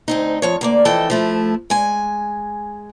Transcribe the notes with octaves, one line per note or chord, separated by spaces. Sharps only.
D2 C4 D#4
F2 F3 C#5
D2 A#3 D5
F2 E3 A4 D#5 G5
F3 A3 E4
G#3 G#5